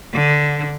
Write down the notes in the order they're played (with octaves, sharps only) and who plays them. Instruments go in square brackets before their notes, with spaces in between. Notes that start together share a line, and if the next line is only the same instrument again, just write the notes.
[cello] D3